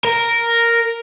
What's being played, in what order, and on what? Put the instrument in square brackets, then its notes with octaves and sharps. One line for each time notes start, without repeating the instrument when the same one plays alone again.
[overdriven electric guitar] A#4